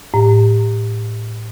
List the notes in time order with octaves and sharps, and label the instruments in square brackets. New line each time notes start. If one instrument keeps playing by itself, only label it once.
[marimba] A2